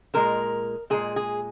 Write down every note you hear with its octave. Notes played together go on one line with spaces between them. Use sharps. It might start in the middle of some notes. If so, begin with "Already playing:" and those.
A#2 G#3 A#4
A#2 G#3 G#4
G#4